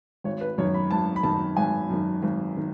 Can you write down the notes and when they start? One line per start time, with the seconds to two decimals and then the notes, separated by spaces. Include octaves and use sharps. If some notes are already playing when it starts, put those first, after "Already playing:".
0.24 G#1 C#5
0.41 B4
0.58 F#2 D#3 C#5
0.74 B5
0.91 G#1 A5
1.16 B5
1.23 F#2 D#3 A5
1.57 G#1 G#5
1.90 F#2 D#3
2.22 G#1
2.57 D#3